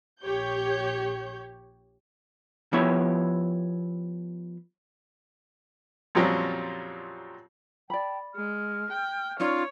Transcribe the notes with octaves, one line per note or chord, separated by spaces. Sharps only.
A#1 G4 C#5 G6
F3 B3 E4 G4 C#5
F2 A#2 F#3 G3 C4 C#4
D5 G5 A5 B5
G#3 F6
G5
C#4 D#4 F4 C#5 D5